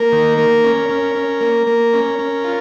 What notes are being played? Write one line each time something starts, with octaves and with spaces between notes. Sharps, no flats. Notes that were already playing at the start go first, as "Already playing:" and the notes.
Already playing: A#3 A#4
D#3
A#3
C#4
C#4
C#4
A#3
A#3
C#4
C#4
F4